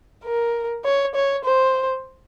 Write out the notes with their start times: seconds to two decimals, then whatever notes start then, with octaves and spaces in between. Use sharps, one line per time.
0.24 A#4
0.84 C#5
1.15 C#5
1.44 C5